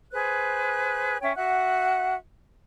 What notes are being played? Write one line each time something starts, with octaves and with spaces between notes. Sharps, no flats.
G#4 B4 C5 F#6
C#4 C#5 E5 G5
F#4 E5 F#5 F#6